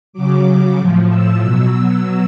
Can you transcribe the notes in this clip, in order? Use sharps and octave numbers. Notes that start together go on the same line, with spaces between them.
C#3 F#3 D6
A2 F3
E6
B2 F#3